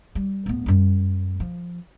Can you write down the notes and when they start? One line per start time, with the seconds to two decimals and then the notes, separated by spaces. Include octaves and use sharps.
0.15 G3
0.46 D1 B3
0.66 F#2 G3
1.40 F3